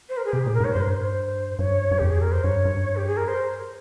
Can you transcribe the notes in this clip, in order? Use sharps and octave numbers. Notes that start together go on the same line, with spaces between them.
C5
A#4
G#4
C3 G4
A#2 G#4
A#4
G#2 C#5
G2 C5
A#4
C5
G2 C#5
G2
F2 G4
G#4
A#4
C5
G2 C#5
G2
G4
G#4
A#4
C5